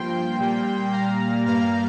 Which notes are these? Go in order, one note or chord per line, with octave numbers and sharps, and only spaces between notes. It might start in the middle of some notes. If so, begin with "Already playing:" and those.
Already playing: G2 F3 A#3 G5 C6
A#2 G3 A#3
F5 A#5
G2 G3 A#3 F5 A#5